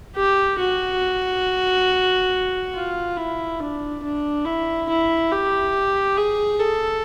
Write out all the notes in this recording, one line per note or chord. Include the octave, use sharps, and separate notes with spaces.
G4
F#4
F4
E4
D4
D4
E4
E4
G4
G#4
A4